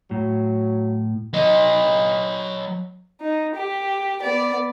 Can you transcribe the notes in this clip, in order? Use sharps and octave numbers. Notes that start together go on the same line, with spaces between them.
A2 F#3
F#3 D#5
D#4
G4
B3 D5